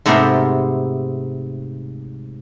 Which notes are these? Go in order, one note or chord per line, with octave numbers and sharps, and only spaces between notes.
G#2 C3 A3 B3 A#4 C5